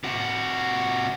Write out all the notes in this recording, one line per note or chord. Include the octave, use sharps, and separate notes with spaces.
C3 F#4